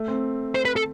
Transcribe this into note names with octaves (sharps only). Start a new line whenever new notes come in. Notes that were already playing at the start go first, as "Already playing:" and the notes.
Already playing: A3
C4
C5
B4
A4